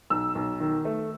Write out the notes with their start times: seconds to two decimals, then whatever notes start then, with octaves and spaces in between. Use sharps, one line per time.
0.10 B1 E6
0.35 B1
0.60 D#3
0.85 A3